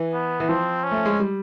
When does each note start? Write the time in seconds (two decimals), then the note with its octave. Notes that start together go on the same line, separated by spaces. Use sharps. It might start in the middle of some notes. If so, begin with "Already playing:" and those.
Already playing: E3
0.13 B3
0.40 E3
0.49 F3 C4
0.84 C#4
0.91 A3
1.05 G#3
1.20 G3